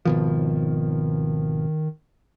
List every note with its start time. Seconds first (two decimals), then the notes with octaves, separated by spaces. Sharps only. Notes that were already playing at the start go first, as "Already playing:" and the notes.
0.05 G#1 B2 D#3 F3